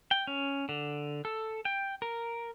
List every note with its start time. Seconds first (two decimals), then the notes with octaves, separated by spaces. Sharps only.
0.11 G5
0.27 C#4
0.69 D3
1.25 A4
1.65 G5
2.02 A#4